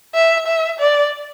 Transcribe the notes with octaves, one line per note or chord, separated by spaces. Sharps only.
E5
E5
D5